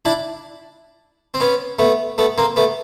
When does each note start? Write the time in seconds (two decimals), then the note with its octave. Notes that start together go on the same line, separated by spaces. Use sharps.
0.05 D4 E4
1.34 C4
1.40 B3 C#4
1.79 A3 B3
2.18 A3 B3
2.38 A#3 C4
2.56 A3 B3